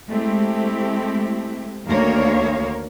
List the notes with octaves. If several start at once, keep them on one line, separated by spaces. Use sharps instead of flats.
G#3 A3 C4 E4 G4
D2 D#3 A#3 A#4 C#5 F5